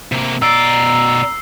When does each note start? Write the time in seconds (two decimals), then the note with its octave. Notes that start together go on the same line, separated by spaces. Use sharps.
0.12 C3 A#3
0.42 B2 D5 A#5 E6 C7